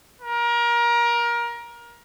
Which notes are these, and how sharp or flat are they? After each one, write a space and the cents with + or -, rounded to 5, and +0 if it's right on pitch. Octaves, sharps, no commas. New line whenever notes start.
A#4 +25